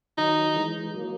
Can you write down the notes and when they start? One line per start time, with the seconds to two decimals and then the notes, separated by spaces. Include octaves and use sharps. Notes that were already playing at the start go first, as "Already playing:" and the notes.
0.18 D#3 F#3 D#4
0.55 E3 G#3
0.94 F#3 A#3